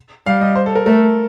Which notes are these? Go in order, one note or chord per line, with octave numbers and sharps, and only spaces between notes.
G3 F5
D#5
C5
A4
A#4
A3 A#4